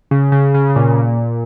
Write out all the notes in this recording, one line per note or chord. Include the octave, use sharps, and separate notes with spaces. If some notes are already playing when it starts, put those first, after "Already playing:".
C#3
C#3
C#3
C#3
A#2
A#2